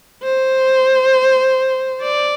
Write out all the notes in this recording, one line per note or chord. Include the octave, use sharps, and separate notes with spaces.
C5
D5